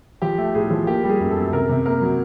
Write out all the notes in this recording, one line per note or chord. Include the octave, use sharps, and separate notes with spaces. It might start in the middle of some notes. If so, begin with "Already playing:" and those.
F3 G4
A3
A2 G#4
F3
A#3 G4
G3
G#4
F#2
A4
F#2
C3 A#4
C3
A#3 A#4
F#3